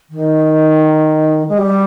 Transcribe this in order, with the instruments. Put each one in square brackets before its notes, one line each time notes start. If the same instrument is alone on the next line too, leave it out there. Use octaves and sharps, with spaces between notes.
[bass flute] D#3
G#3
G3